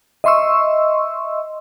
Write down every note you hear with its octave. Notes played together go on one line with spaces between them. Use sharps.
D#5 E5 C6 C#6 E6